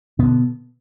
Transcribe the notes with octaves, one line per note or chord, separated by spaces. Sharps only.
B2 D3 B3